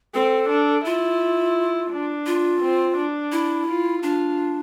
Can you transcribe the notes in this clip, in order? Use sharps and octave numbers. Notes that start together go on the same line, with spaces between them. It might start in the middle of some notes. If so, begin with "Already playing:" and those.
C4 A4
D4
E4 F4
D4
F4
C4
D4
E4
F4
D4 F4